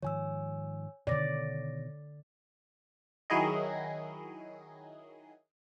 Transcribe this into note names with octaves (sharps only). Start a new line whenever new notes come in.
G#2 D#3 F3 C#5 G#5 E6
B2 D3 D#3 C#5 D5 A#6
D#3 F#3 E4 G#4 D#5